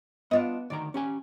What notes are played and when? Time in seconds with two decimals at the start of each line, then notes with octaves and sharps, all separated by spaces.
0.31 B3 D4 F4 D#5
0.70 D2 D#3 D5 A#5
0.94 C#4 G4 G#5